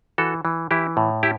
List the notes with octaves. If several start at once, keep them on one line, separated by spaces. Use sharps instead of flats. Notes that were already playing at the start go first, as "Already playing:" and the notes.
E3 F#4 A4
E3
E3 E4 G4
A2
E4 G4